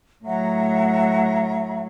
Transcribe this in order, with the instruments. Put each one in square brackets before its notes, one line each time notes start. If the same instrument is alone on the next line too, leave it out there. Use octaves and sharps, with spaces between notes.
[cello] A2 F#3 [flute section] E5 F#5 A#5